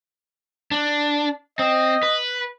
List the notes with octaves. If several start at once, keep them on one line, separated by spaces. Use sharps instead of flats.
D4
C4 D#5
B4